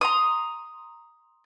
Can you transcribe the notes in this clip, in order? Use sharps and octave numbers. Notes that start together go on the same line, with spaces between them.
A#5 C6 D#6